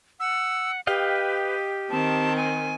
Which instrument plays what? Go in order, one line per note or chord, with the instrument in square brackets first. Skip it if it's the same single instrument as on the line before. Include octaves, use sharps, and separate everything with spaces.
[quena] F#5 [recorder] E6
[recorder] G4 [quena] B4 [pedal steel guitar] D#5 F5 G5
[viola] D#3 C4 [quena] A5
[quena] G#5